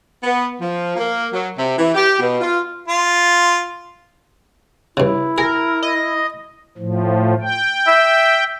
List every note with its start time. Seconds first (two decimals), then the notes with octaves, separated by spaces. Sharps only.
0.23 B3
0.60 F3
0.97 A#3
1.33 F#3
1.57 C3
1.78 E3
1.95 G4
2.19 B2
2.41 F4
2.88 F4
4.97 G2 C#3 E4
5.38 G#4 A#4
5.82 D#5
6.78 A2 F3
7.41 G5
7.87 E5